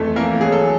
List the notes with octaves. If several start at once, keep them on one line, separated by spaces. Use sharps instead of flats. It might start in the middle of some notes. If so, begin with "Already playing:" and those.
Already playing: F2 E3 A3 A4
E3 A#3 A#4
F#3 G#4
A4